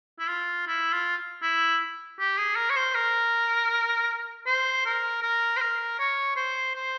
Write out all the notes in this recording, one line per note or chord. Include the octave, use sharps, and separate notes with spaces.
E4
F4
E4
F4
E4
G4
G#4
A#4
C#5
C5
A#4
C5
A#4
A#4
C5
A#4
C#5
C5
C5